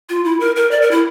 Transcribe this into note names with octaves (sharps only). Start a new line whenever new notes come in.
F4
E4
A#4
A#4
D5
A#4
E4